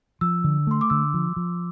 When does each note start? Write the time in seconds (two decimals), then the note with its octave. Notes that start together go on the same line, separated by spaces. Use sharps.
0.21 F3 E6
0.44 D3
0.67 A3 C6
0.81 D6
0.90 D3 E6
1.14 F3
1.36 F3